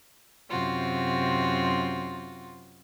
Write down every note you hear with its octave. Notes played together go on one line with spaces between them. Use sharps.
F#2 C3 C4 F4 F#4